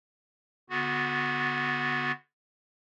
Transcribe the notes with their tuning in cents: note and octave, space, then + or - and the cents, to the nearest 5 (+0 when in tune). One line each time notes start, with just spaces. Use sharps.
D3 -25 B3 +0 F#4 -20